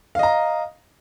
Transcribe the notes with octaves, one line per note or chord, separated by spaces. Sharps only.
D#5 F5 A#5